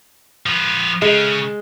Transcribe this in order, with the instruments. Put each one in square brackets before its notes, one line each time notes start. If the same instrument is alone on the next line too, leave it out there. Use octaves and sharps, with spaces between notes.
[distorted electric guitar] F3 B4
[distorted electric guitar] C#3 [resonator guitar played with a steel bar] G#3